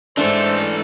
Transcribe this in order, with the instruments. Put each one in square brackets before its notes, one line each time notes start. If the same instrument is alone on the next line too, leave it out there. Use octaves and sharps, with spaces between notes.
[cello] G#2 A4 [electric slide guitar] E3 A3 [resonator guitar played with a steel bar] D4 [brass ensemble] C5